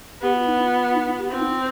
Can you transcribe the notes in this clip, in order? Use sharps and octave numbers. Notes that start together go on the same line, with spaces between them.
B3 G4
F4
D#4
F4
D#4
F4
G4
C4 F4
D#4
F4